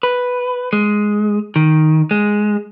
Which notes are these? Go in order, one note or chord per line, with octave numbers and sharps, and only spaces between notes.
B4
G#3
D#3
G#3